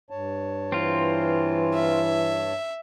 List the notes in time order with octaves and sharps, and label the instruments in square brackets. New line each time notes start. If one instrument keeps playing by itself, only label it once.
[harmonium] G2 C#5 A5
[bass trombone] E3 [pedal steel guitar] C4 F4
[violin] E5